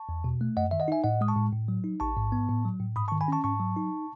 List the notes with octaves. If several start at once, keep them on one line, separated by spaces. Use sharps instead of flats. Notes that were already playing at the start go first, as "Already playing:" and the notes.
Already playing: A5 C#6
E2
B2
A3
F#2 D#5 F#5
D#3 E5
D#5 F#5
D#4 E5 G#5
A2 D#5 F#5
G#3 D#6
A5 C#6
A2
A2
F#3
D#4
A1 A5 C#6
G#2
B3
A2
F#3
A2
G#2 B5 D#6
A5 C#6
D#3
G#5 B5
C#4 A5 C#6
G#2 A5 C#6
F#3
D#4